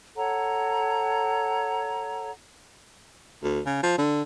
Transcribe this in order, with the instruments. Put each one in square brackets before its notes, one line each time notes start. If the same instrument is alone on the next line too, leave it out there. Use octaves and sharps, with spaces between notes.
[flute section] A4 C#5 F#5 A#5
[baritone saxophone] D2
C#3
F3
D3